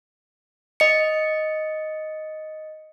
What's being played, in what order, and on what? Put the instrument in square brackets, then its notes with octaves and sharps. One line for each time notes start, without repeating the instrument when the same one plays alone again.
[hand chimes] D#5 C#7